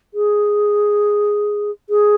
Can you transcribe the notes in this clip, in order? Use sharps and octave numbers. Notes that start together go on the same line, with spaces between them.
G#4
G#4